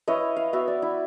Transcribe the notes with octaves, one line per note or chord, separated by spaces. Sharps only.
E4 B4 C#5 D#5
F5
B3 F#4 E5
D5
E4